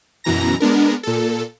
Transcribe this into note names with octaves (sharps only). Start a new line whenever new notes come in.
F#2 B2 E3 A#5 A#6
G#3 B3 D4 A#4
A#2 A4